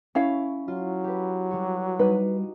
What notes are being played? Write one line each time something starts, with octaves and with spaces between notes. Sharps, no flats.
C#4 E4 C#5 F5
F#3 F4
G4 B4
G3 F#4
G3 D#4 B4